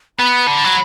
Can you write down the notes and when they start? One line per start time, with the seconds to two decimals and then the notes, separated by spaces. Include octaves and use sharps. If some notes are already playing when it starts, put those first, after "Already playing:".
0.19 B3 B5
0.47 D3
0.64 F#3